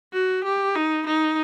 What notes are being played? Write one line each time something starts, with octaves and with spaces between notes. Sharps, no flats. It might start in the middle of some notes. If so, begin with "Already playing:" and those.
F#4
G4
D#4
D#4